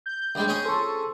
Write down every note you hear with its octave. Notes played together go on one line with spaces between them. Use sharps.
G6
D2 G3 G#3
C#4 G#4 D#6
A4 C5 C#5